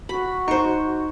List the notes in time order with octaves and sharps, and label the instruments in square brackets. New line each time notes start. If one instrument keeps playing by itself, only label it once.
[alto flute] F#4 [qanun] B5
[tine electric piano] D#4 [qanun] C5 C#6